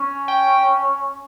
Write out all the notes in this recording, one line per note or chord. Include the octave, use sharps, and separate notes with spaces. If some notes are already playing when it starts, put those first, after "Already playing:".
Already playing: C#4
G5